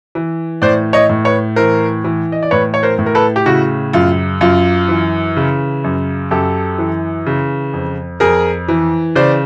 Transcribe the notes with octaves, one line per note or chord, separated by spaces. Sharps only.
E3
A2 C5 D5
C#5 D#5
A2
B4 C#5
E3 A#4 C5
E3
D#5
D5
A2 B4 C#5
C#5
A#4 C5
A2
A#4
A4 B4
G4
C#3 E4 F#4
F#2 F4
F#2 F4
E3
C#3
F#2
F#2 G4 A4
E3
C#3
F2
F2 G#4 A#4
E3
C#3 C5 D5